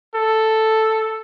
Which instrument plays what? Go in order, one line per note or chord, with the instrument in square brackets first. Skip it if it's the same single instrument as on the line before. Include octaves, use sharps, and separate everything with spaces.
[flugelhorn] A4